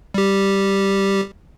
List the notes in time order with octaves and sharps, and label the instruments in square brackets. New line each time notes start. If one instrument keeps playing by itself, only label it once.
[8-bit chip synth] G3 G4